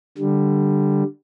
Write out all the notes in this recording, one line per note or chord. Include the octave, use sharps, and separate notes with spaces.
D3 G3